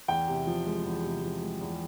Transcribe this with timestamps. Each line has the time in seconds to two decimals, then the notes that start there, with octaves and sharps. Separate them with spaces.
0.08 E2 G5
0.27 C3
0.47 F3
0.66 G#3
0.85 E2
1.04 C3
1.23 F3
1.42 G#3
1.61 E2